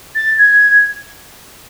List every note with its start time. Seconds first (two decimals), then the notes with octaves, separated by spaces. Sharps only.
0.15 A6
0.38 G#6